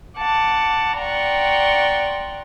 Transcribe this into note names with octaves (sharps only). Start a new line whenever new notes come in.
F#5 A5 D6
D5 F#5 G5 A#5 C6 C#6